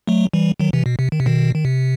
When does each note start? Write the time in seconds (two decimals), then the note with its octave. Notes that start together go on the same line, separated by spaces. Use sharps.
0.07 F#3 A3
0.34 E3 G3
0.60 D#3 F#3
0.73 C3 E3
0.86 B2
0.99 C3
1.12 D#3
1.20 C3
1.26 B2 D#3
1.54 D#3
1.65 C3